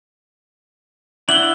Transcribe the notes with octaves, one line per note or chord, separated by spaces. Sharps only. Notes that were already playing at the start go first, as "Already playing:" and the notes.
D4 E4 F#5 F#7 G7